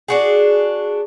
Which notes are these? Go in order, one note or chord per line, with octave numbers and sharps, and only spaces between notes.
D4 F#4 G#4